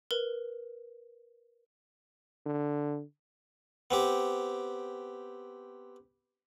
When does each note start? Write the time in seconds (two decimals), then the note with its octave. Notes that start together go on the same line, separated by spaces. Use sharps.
0.11 A#4 B4
2.46 D3
3.91 B3 C4 G4